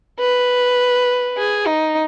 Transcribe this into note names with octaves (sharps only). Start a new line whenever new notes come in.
B4
G#4
D#4